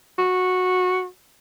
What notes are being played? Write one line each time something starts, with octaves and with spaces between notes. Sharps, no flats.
F#4